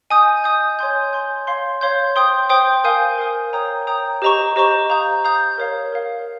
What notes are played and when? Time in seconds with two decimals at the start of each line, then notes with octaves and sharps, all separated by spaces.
0.10 D#5 G#5 D#6 G6
0.44 D#5 G#5 D#6 G6
0.79 C#5 G#5 C6 G6
1.13 C#5 G#5 C6 G6
1.47 C#5 F5 C6 G6
1.81 C#5 F5 C6 G6
2.16 C5 G5 C6 D#6 G6
2.49 C5 G5 C6 D#6 G6
2.84 A#4 F5 G#5 D#6 G6
3.18 A#4 F5 G#5 D#6 G6
3.53 C#5 G5 A#5 D#6 G6
3.87 C#5 G5 A#5 D#6 G6
4.22 G4 C5 D#5 A#5 C#6
4.56 G4 C5 D#5 A#5 C#6
4.90 F5 A#5 D#6 G6
5.24 F5 A#5 D#6 G6
5.58 A#4 C#5 F5
5.92 A#4 C#5 F5